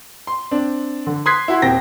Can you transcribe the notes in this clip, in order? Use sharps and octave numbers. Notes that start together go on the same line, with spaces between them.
C6
C4 D4
D3
C6 D#6 F#6 G#6 B6 C7
E4 F#4 C6
D#1 C4 G5 A#6